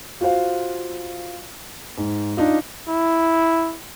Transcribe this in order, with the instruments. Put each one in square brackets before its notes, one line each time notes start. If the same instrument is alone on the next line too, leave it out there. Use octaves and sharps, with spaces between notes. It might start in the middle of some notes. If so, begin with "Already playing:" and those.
[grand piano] F4 F#4 C5 F5
G#2
D4 D#4 F4
[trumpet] E4